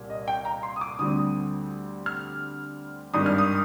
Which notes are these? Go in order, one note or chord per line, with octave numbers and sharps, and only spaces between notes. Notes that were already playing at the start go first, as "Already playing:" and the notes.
Already playing: C2 A#2 G3
D#5
G5
A#5
C6
D#6
D6
D2 D3 G3 C4 D#6
F6
G#1 G2 D#3 G3 D#6
F6
D#6